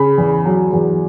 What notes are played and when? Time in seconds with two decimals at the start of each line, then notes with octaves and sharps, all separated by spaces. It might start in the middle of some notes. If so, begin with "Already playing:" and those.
Already playing: C#3 B5
0.18 E2
0.46 F#3
0.73 E2